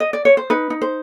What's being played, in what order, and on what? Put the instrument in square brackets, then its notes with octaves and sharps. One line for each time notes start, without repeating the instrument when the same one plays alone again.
[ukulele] D#5
D5
C#5
C5
D#4 B4
D#4
C5